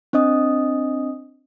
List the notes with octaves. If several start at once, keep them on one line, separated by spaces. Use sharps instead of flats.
C4 D4 D#5 D#6